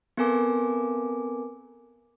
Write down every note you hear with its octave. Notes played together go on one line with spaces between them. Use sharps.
B3 C4 A4 A#4 G#5 D6